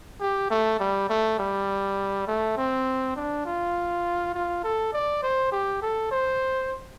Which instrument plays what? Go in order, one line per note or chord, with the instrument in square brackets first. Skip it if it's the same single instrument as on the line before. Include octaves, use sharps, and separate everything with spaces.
[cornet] G4
A3
G3
A3
G3
A3
C4
D4
F4
F4
A4
D5
C5
G4
A4
C5